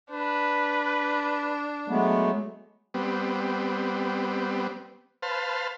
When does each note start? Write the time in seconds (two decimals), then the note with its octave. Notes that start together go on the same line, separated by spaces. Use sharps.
0.11 D4 B4
1.88 F#3 G#3 A3 B3
2.94 G3 B3 C4
5.22 B4 C5 F5 A5